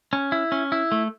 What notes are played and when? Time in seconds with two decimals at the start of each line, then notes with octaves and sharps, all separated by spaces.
0.13 C#4
0.32 E4
0.52 C#4
0.72 E4
0.92 A3